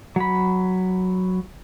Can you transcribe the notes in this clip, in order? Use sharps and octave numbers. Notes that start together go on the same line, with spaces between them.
F#3 B5